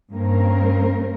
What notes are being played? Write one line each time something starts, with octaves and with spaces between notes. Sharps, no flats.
G2 A#3 C4 C#4 A#4